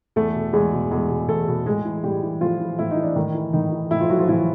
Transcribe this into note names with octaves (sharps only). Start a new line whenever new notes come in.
E2 A3 A4
B2
E2 G#3 G#4
B2
E2 G#3 G#4
B2
E2 A3 A4
B2
A2 G#3 G#4
E3
A2 G3 G4
E3
A2 F3 F4
E3
A2 E4
D#4
E3
D4
A2 D#3 D#4
E3
A2 D#3 D#4
E3
A2 E3 E4
F3 F4
E3 F#3 F#4
F3 F4
A2 E3 E4